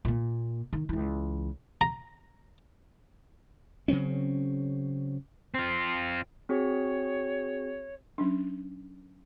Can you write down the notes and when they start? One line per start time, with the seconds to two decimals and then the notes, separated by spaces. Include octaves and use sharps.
0.05 A#2 A#3
0.73 D#3
0.89 C#2 E3
1.81 A#5
3.88 C#3 F#3 C4 C#4
5.54 C4 F4
6.49 C4 F#4 G#4 C#5
8.18 F#3 C#4 D4